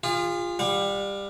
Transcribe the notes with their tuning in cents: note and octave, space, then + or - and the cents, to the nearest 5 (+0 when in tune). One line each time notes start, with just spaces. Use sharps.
F4 +0 G#4 -40
G3 +20 F#5 -45